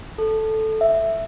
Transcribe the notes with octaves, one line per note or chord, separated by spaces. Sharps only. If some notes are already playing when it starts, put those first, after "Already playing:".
A4
E5